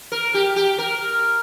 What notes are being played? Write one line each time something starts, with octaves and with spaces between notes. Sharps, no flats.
A#4
G4
G4
A#4